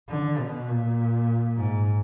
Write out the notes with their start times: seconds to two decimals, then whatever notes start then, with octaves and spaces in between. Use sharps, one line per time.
0.09 D3
0.38 B2
0.69 A#2
1.57 G#2